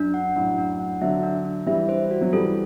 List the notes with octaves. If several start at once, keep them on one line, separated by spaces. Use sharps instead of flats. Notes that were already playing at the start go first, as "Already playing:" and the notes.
Already playing: F#2 D4
F#5
F#2 A2 D4
D4
F#5
D3 F#3 E5
D4
D4
E3 G3 E5
C5
F#4
F#3
E3 G3 A4